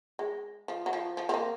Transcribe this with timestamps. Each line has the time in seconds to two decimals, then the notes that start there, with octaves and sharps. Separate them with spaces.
0.19 G#3
0.68 F3
0.86 F#3
0.93 F3
1.17 F3
1.29 C4
1.34 A#3